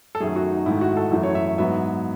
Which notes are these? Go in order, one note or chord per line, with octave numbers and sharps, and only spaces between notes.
A4
F#2 D#3 A3 G#4
F#4
D#4
G#2 D#3 A3 E4
F#4
A4
F#2 E3 A3
C#5
E5
E5
G#2 F#3 B3 E5